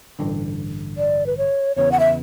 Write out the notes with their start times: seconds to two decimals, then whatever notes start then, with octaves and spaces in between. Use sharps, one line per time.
0.19 A1 G2 D3
0.98 D5
1.26 B4
1.38 C#5
1.76 E2 C#3 E3 B3 C#5
1.92 F#5
2.00 E5